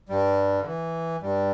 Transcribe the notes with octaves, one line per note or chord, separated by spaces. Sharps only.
G2 G3
D3
E3
G2 G3